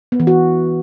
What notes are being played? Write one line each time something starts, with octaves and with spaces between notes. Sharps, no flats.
B3
E3
F#4